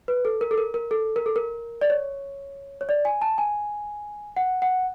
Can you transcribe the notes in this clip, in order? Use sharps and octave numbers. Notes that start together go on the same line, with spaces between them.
B4
A4
A#4
A4
A#4
A#4
A4
A#4
A4
A#4
D5
C#5
C#5
D5
G#5
A5
G#5
F#5
F#5